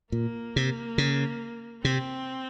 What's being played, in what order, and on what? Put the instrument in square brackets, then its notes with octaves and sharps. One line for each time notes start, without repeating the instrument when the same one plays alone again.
[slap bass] A#2 [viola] A#3
[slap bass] C3
C#3
[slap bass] C3 [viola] C4